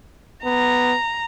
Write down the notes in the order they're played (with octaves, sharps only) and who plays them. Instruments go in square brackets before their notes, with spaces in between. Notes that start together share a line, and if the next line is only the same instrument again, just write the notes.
[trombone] B3 [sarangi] A#5